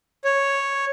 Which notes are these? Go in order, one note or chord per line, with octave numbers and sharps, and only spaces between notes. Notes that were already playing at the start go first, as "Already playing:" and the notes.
C#5